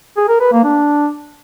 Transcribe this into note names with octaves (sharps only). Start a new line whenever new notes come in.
G#4
A#4
B4
A#3
D4